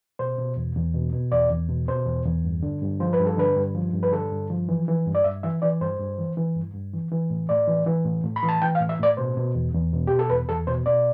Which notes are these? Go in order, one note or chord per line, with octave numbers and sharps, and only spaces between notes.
B2 C5
B2
E2
E2
B2
B2
E2 D5
E2
B2
B2 C5
E2
E2
G2
D3
G2
F3 C5
B4
G2
A4
D3 B4
G2
F3
G2
B4
D3 A4
G2
F3
E3
E3
G2
D5
G2 E5
E3 E5
E3 D5
G2 C5
G2
E3
E3
G2
G2
E3
E3
A2
A2 D5
E3
E3
A2
A2
B5
E3
A5
E3 G5
F5
A2
E5
A2 D5
B2 C5
B2
E2
E2
B2
B2 G4
A4
E2 B4
E2 A4
B2 C5
B2 D5